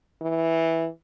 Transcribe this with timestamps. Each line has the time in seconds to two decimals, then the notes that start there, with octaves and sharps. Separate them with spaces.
0.21 E3